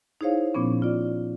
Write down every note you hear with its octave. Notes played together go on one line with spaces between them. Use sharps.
D#4 E4 G#4 C5 C#5 F5
A#2 F3 B3 C#4
F4 D5